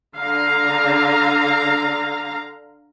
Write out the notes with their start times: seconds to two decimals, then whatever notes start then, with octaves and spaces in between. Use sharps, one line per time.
0.16 D3 F5 A#5